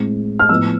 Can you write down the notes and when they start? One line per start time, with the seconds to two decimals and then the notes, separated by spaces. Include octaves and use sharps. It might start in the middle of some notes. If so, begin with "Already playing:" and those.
Already playing: A2 G#3 C4
0.39 F6
0.49 A2 F3 B3 E6